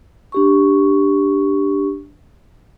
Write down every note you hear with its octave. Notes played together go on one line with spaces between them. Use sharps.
D4 G4 C#6